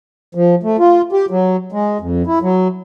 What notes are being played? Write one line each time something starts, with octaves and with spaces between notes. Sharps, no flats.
F3
A3
F4
G4
F#3
G#3
F2
E4
F#3